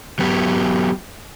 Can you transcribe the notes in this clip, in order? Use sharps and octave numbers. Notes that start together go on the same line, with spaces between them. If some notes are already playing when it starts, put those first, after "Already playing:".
F#3 B3 G4